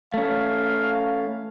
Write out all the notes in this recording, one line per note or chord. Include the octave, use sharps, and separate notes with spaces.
A3 C#4 F5